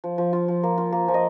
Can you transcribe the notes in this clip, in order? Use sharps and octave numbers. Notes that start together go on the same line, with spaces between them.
F3
F3
F4
F3
A#3
F4
A#3
F3
D#5